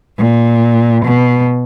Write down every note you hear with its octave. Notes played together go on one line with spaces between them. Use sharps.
A#2
B2